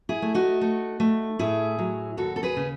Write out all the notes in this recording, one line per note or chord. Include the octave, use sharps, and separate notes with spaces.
E4 G#4
A3
D#4 F#4
A3
A3
A2 E4 G#4
F#3
D#2 F#4 A4
A4
G#4 B4
C#3